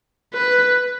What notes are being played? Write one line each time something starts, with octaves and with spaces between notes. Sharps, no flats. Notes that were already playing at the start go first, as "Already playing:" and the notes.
B4